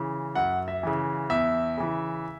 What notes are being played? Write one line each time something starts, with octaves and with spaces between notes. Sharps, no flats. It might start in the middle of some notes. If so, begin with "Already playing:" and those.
Already playing: C#3 E3
F#2 F#5
E5
C#3 E3
E2 E5
C#3 E3